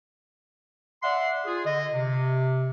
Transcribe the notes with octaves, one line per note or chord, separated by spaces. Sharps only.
D5 E5 F#5 C6
F4 G#4
D3 D#5
C3